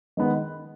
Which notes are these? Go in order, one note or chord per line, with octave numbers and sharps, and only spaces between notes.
D#3 G#3 B3